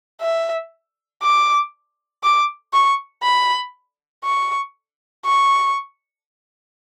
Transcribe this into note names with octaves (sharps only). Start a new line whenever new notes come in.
E5
D6
D6
C#6
B5
C#6
C#6